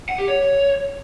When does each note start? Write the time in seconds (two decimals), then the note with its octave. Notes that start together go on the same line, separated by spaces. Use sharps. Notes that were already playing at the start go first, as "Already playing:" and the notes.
0.09 F#5
0.18 G4
0.28 C#5